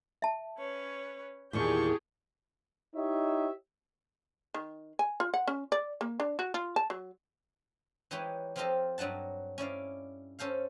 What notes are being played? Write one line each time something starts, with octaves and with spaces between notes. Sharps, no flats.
E5 A5
C#4 B4 C#5
E2 A#2 D#3 G4 G#4 A5 C#6 G6
D#4 E4 G4 C#5 D#5 E5
D#3
G#5
F4
F#5
C#4
D5
A#3
D4
F#4
F4
A5
F#3
E3 G#3 D#4 G4 B4 C#5
F3 C4 F4 G4 A4 D#5
G2 F#3 D#4 F#5 A5
C#4 E4 D5 F5
C#4 A4 C5 F5